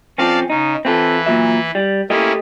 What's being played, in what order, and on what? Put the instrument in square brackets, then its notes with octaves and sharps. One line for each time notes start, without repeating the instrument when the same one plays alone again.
[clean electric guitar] F3 C4 C#4 [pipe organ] D5 F5 A5
[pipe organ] C#3 [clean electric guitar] D#4
[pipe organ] E3 B4 [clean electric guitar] C4 F4 A4
[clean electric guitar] A#2 F#3 E5
G3
[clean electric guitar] A3 G4 D#5 [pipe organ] A#3 C#4 E4